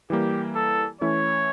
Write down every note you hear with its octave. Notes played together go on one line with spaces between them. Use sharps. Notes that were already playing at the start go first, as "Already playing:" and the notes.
E3 G3 A#3 G4
A4
E3 A3 C#4 E4 C#5